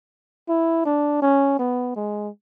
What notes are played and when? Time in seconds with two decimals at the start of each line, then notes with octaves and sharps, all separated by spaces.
0.49 E4
0.86 D4
1.22 C#4
1.59 B3
1.96 G#3